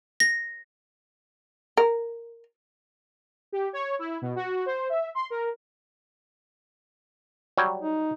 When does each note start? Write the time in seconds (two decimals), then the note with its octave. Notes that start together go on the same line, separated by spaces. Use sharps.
0.20 A#6
1.77 A#4
3.52 G4
3.73 C#5
3.99 E4
4.22 B2
4.36 F#4
4.66 C5
4.89 E5
5.15 C6
5.30 A#4
7.58 F#3 G3 C#5
7.82 D#4